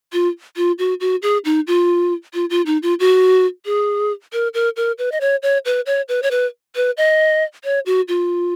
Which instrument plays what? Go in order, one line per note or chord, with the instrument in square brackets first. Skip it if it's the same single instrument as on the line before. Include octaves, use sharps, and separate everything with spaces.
[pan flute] F4
F4
F#4
F#4
G#4
D#4
F4
F4
F4
D#4
F4
F#4
G#4
A#4
A#4
A#4
B4
D#5
C#5
C#5
B4
C#5
B4
C#5
B4
B4
D#5
C#5
F#4
F4